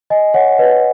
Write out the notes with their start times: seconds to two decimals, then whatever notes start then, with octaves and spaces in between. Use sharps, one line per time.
0.10 D#5 G#5
0.34 C#5 F#5
0.58 B4 D#5